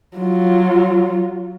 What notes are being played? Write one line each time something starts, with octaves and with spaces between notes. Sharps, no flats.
F#3 F4